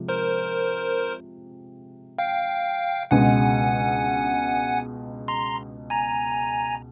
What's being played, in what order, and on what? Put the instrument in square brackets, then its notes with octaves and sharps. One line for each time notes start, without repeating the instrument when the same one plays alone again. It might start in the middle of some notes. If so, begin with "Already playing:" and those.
Already playing: [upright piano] C3 F3 G#3
[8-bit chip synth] A#4 C5
F5 G5
[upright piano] C#2 B2 G#3 [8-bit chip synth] F#5 G#5
[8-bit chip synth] A#5 C6
G#5 A#5